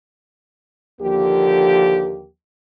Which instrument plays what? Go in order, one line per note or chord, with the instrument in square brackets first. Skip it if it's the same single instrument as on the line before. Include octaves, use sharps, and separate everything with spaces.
[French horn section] D#2 D3 F3 A#3 G4